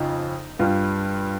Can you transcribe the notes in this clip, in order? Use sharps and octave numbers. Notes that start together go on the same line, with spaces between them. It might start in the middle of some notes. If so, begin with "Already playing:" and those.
Already playing: F2 C#3 D#4
G2 G3 F4